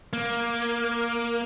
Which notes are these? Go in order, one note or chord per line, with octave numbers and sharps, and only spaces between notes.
A#3